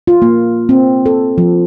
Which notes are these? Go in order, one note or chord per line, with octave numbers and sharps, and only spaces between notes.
F4
A#3
C4
A4
F3